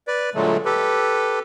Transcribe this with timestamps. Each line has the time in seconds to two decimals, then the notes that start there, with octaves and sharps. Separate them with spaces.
0.07 B4 D5
0.34 A#2 D3 F#3 G#3 A3
0.65 G4 A4 B4